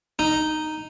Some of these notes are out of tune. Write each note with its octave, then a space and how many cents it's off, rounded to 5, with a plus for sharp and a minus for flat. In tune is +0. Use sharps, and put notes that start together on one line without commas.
D#4 -5